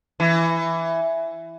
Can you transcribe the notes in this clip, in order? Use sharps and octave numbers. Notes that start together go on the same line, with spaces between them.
E3